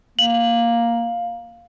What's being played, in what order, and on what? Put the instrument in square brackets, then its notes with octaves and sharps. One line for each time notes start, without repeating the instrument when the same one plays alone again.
[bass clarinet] A#3 [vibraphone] F5 [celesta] F#7